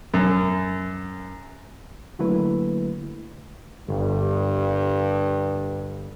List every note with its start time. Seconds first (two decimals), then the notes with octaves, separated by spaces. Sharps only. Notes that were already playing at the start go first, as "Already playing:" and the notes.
0.14 F#2
2.19 D3 F#3 A3 A#3 E4 B4
3.89 G1 G2